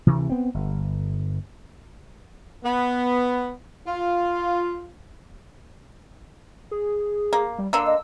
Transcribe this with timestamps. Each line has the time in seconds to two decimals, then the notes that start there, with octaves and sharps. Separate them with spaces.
0.07 D2 C3 E3
0.29 B3 C4
0.54 G1
2.64 B3
3.87 F4
6.71 G#4
7.33 A#3
7.58 G3
7.73 D3 A#3 E6
7.86 D#5